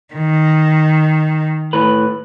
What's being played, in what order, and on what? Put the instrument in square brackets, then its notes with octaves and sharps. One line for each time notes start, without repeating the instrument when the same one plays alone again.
[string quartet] D#3
[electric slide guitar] A2 B4